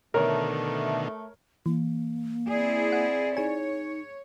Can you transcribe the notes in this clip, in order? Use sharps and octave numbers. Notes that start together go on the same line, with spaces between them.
B2 D3 D#3 A3 A#4 C#5
E3 A#3
C4 E4 G#4 D5
F#5
D#4 G#4 C#5 G#5